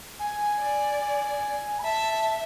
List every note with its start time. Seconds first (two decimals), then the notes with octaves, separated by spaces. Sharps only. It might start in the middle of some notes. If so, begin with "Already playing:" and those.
0.19 G#5
0.60 D5
1.01 G#5
1.79 B5
1.84 E5 A5
2.12 A5